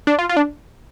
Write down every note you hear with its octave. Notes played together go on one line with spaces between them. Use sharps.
D4
F4
F4
D4